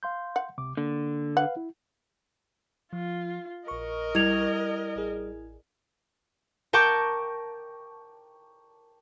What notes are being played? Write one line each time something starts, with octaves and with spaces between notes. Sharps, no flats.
F5 C6 G6
F#5
C#2 C3 D6
D3 A#3
B4 F5 F#5
E4
F3 F4
A#1 A#4 D#5 C#6
G3 E4 G#6 F7
A1 G#4
A#4 G5 A5 C#6 D6 G6